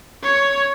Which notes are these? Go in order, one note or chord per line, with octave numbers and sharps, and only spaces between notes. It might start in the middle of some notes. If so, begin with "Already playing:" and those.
C#5